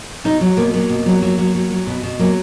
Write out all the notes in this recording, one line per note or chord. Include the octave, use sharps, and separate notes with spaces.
B2 D#4
F#3
B2 A#3
F#3 A#3
B2
F#3
F#3
F#3
F#3
F#3
B2
B2
F#3 A#3